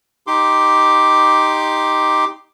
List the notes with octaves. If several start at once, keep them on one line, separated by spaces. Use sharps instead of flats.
D#4 G4 C6 D6